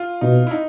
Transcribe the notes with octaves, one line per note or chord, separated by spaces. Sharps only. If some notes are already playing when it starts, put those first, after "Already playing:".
Already playing: F4
B2 D#4
E4
D#4